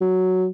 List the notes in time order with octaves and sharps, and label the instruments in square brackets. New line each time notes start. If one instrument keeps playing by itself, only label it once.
[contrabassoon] F#3